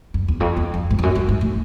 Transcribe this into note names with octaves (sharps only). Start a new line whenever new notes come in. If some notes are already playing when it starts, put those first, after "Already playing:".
F#2
E2
F2
E2
F2
G#2
F2
F#2
G2
G#2
A2